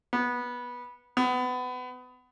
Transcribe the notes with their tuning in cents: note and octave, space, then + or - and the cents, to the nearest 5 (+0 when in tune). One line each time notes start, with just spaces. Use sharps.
B3 -15
B3 +25